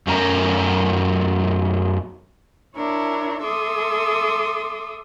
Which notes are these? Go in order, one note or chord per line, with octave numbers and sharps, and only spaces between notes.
F#2 A3 C#4 A#4 A#5
D4 E4 A#4 C#5
A4 E5 C6 D6 D#6